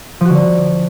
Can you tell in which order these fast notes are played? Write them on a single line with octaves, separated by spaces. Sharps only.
F3 F#4 D3